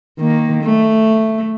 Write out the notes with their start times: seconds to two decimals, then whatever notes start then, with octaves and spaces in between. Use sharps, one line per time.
0.18 D#3 A#3
0.63 A3